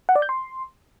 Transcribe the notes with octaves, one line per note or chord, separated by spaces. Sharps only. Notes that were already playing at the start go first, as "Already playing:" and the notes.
F#5
D5
G6
C6